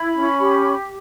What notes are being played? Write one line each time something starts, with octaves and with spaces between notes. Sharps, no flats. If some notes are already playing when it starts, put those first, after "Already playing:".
Already playing: E4 B5
C#4
G4